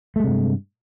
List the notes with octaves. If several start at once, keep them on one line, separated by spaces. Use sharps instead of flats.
G2 C3 G#3 A3